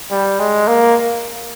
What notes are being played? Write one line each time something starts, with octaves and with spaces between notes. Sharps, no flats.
G3
G#3
A#3